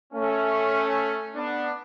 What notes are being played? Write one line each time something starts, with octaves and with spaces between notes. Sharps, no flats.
A3 C#4
B3 D4